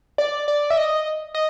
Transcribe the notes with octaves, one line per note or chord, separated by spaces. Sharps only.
D5
D5
E5
D#5
D#5